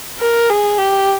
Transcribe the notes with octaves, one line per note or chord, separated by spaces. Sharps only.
A#4
G#4
G4